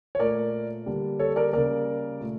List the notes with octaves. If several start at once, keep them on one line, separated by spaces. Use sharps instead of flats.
C#5
A#2 A3 A#4 D5
D3 G3 A#3
A4 C#5
A#4 D5
C#3 G3 A#3 A#4 D5
A#2 A3